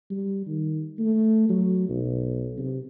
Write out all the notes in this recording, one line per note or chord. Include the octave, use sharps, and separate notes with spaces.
G3
D#3
A3
F#3
B1
C3